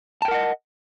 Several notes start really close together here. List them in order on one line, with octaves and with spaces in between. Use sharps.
A5 G5 A#4 F#5 D#5